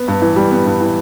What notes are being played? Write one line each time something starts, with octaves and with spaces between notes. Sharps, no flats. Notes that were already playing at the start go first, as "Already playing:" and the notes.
Already playing: B3
G2
E3
G3
B3
G2
E3